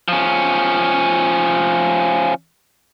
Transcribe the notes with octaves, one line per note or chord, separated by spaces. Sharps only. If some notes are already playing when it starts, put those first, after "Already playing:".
F3 C#4